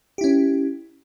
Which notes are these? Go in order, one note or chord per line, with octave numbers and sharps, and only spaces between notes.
C#4 E4 G4